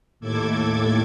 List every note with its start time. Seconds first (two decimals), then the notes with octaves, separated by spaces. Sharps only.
0.20 D#2 A2 A4 D6 G#6